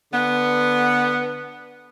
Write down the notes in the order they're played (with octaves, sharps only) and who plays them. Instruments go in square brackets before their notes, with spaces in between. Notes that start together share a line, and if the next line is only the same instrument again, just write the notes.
[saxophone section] D3 B3